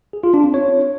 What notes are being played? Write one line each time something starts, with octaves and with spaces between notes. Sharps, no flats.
G#4
F4
D4
C4
C#5